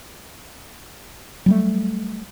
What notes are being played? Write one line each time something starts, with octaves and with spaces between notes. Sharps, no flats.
F#3 G3 A3